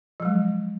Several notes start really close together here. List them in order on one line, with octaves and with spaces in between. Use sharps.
F3 F#3 G#3